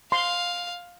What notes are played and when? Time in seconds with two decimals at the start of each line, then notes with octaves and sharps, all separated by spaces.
0.12 F5 C6